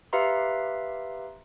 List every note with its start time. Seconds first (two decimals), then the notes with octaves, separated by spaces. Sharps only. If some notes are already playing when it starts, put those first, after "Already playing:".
0.13 G4 B4 E5 F5 A#5 C6